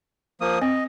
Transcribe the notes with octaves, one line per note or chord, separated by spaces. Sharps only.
F3 A#3 D#6
C4 D#5